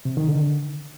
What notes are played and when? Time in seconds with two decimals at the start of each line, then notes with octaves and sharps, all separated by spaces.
0.05 C3
0.17 D#3
0.29 D3